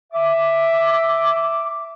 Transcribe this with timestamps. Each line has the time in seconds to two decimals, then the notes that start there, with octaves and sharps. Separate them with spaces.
0.13 E5 D6